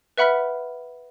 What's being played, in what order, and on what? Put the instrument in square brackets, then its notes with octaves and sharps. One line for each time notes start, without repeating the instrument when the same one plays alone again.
[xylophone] B4 E5 F#5 B5 F6 B6